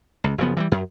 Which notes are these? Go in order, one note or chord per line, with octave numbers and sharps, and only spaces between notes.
C#2
F#1 C#3 F3 B3
E3 F#3 G3
F#2